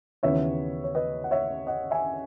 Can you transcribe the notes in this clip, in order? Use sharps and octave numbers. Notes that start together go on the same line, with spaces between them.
D#2 C#3 E3 B3 C#5 E5
C#5
B4 D#5
F#5
C#5 E5
D#5 F#5
E5 G#5